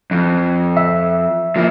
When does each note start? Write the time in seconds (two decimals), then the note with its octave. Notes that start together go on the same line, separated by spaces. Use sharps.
0.11 F2
0.77 E5
1.56 F3 A#3